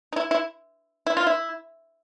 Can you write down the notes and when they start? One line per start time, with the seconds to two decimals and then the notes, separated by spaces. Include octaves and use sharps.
0.13 D#4
0.16 E4
0.31 E4
1.07 E4
1.17 F4
1.27 E4